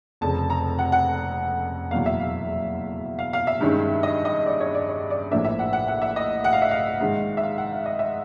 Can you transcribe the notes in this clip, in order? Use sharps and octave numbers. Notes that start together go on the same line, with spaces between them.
F1 F2 C#3 A5
A#5
F#5
F#5
F#1 E2 B2 F#3 F5
E5
F5
F5
F5
E5
G2 D#3 G#3 C#4
D#5
D#5
D5
C#5
D5
C#5
D5
A#1 A2 F3 A#3 D4 E5
E5
F#5
F#5
F#5
E5
D#5
F#5
F5
E5
F5
G#2 D#3 G#3
E5
F5
F#5
F5
D#5
E5